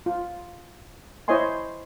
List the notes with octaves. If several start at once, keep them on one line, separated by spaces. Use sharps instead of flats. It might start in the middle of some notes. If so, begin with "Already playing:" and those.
F4
E4 C5 C#5 D#5 G#5 C6